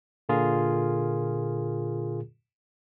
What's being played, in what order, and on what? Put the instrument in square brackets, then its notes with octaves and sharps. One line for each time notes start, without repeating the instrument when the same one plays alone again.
[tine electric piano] A#2 D3 F4 G#4 A#4